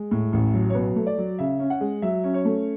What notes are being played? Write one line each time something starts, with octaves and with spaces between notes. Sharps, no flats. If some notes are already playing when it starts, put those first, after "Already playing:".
Already playing: G#3
A2
A1
F#3
C#5
B2 B4
A3
D5
F#3
C#3 E5
C#4
F#5
G#3
F#3 E5
C#4
C#5
A3